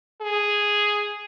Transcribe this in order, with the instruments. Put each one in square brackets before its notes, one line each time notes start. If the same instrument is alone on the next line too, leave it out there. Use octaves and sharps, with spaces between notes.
[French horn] G#4